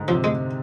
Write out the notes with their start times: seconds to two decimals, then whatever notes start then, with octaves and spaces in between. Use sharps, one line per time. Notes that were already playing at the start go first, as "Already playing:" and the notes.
Already playing: G#2 D3
0.08 C3 F3
0.24 G#3